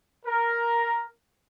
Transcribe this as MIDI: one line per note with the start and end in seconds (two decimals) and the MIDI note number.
0.24 1.02 70